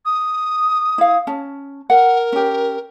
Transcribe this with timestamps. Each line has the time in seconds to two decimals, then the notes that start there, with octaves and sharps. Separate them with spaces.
0.06 D#6
0.98 E4 F5
1.27 C#4 A5
1.90 A#4 F#5
2.32 C#4 G4